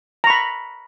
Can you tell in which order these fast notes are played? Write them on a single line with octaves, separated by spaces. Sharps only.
A#5 C#6 B5